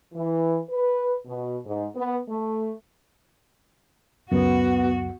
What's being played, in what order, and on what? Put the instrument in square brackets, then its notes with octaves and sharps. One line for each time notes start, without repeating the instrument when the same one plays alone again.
[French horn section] E3
B4
B2
G#2
B3
A3
[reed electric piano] C#2 F#2 [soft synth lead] B3 [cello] F#4